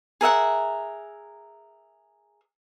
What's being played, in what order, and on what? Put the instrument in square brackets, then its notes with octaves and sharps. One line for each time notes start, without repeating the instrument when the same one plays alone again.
[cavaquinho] G#4 A#4 E5 F#5